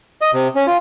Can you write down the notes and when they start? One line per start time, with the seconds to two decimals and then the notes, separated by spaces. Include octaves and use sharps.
0.21 D#5
0.33 C3
0.55 C#4
0.67 F4